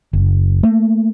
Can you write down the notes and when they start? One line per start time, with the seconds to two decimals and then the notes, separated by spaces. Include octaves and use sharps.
0.13 F#1
0.63 A3 A#3